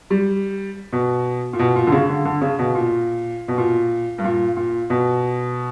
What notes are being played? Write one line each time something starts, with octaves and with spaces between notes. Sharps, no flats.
G3
B2
A#2
B2
A#2
D3
C#3
D3
D3
C#3
B2
A#2
B2
A#2
G2
A#2
A#2
B2